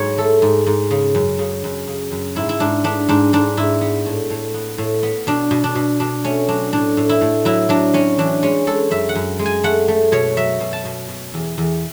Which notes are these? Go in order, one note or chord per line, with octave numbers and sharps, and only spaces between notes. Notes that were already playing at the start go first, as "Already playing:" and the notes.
Already playing: G#2 F#3 C#5
A3 A4
G#2
G#2
C#3
F#2
C#3
F#2
C#3
F#2
G#2 E4
E4
G#2 D4
B3 D4
G#2 D4
G#2 D4
G#2 E4
B3
A2
A2
B3
A2
B3
B2 D4
B2
D4
B2
B2 D4
A3 C#4
F#3 D4
A2 D4
A2
E4
A2
F#3 E4
F#3 D4
F#3 C#4
E3 D4
G#3 C#4
G#3 A4
F#2 E5
F#5
F#2
G#3
G#5
A3 F#5
A3
B2 C#5
F#3 E5
B2
A5
B2
B2
E2
E2